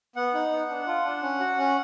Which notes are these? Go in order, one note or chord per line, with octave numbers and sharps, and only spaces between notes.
B3 F#5
D#4
B3
D4
F4
D4
C#4
F#4
C#4